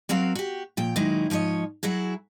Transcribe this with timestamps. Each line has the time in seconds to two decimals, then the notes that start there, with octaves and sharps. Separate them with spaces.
0.09 F#3 C4 F#4 A#4 F5
0.35 F#4 G4
0.77 A#2 F3 G5
0.96 A#2 D#3 F#3 G#3 D#4 E4
1.30 G#2 F3 G4 C#5 D#5
1.83 F#3 E4 F#4 G#4